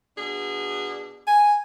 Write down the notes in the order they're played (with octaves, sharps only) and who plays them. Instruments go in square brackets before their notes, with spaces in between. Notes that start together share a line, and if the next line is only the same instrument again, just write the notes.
[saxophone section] B2 D4 G#4
[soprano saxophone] G#5